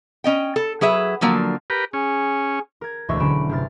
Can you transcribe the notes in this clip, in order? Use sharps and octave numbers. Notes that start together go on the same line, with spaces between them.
C#4 D#5 G5
A4
F#3 G#4 B4 E5
D3 F3 F#3 A#3
G4 A#4 B4
C#4 G#4
A#4 G#6
E1 D2 D#5 E5 C#6 E6
D3 F#3 C#4 B5 D7 E7
G1 C3 F6 A6